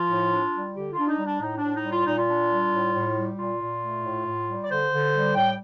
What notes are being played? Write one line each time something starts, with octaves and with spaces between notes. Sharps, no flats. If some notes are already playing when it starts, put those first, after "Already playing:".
Already playing: F3 F4
A2
D4
G3
D3 G4
F4
D4
D#4
G3
D4
A2 D#4
D4
A2
D#4
G3
F4
A#2 D#4
F4
D4
G3
A2
A2
G3
A#2 F4
A#2
A3
A2
A2
G3
D5
D3 C5
D3
G3
A2 G5